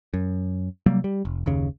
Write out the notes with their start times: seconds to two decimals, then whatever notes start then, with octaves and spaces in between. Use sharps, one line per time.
0.14 F#2
0.86 C3 F#3 G3 A#3
1.04 G3
1.25 F1
1.46 F#1 D#2 C#3